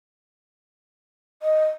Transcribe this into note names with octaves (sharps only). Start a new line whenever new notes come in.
D#5